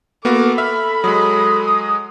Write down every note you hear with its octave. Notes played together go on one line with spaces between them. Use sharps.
A#3 B3 F#4 A4 D6
E5 B5 F6
F#3 G#3 D#6